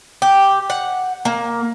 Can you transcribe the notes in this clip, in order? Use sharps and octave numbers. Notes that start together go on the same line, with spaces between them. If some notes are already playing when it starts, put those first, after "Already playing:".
G4
F#5
A#3